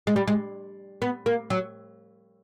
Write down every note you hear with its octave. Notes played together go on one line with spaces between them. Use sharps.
G#3
G3
G#3
B3
A#3
F#3